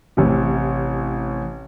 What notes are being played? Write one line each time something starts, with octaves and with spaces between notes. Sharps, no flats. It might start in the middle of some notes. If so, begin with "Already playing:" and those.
A1 C3